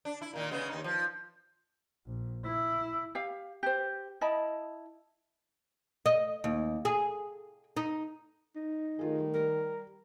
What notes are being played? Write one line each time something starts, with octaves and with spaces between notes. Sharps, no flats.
D4
E4
A#2 D#3 A#3
C#3 G#3 B3
D#2 D#4
F3
A#1
E4
G4 F5
G4 C5
E4 D#5 A5 B5
D#5
D#2
G#4
D#4
D#4
D#3 A3 F4 G#4
G3 A3
G3 A#4